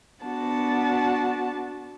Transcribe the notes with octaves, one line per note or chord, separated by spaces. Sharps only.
B3 D4 F#4 A5